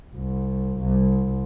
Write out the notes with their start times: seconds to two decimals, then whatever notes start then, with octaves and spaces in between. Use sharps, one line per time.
0.15 C2
0.79 C2